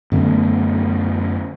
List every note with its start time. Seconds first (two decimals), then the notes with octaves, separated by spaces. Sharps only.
0.12 F#2 D3 A3 B3